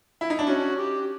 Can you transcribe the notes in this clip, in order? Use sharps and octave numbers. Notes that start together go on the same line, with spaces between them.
E4
D#4
D4
C#4 F#4
G4